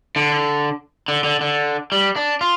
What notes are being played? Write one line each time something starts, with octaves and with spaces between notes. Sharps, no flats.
D3
D3
D3
D3
G3
D4
F4